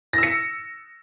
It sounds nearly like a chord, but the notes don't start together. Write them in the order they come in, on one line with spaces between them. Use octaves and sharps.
A#6 E6 C#7